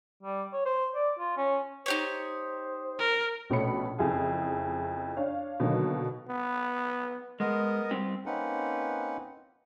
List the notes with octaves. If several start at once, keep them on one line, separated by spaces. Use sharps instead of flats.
G3
C#5
C5
D5
F4
C#4
D#4 G4 C5 C#5
A#4
A#1 B2 A3 C#4 B5 C#7
F#1 F2 E4 G#4 G#5
D4 C#5 F5
B2 D3 D#3 F#3 A#3 D#4
B3
G#3 B3 A#4 D#5
G3 C4 G4
A#3 C4 C#4 D#4 B4 F#5